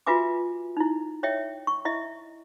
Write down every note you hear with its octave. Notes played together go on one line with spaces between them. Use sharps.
F4 F#4 B4 E5 G#5 D6
D#4 E4
C#5 D#5 E5 G5
C#6
E4 D#5 E5